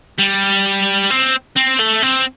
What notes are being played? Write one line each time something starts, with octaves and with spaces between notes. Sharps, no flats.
G3
C4
C4
A3
C4